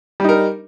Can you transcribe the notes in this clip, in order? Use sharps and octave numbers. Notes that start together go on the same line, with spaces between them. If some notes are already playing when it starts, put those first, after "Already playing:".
G3 D#4 A#4